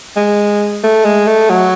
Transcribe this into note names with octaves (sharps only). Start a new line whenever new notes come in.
G#3
A3
G#3
A3
F#3